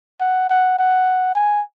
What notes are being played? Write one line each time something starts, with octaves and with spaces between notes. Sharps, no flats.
F#5
F#5
F#5
G#5